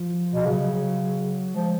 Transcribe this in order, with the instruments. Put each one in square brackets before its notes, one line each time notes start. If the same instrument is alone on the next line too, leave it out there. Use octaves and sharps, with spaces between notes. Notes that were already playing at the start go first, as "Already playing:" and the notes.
Already playing: [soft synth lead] F3
[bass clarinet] B2
[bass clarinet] C#3 [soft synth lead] F#3
[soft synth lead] F#3
F#3
[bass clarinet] F3 [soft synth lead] G#3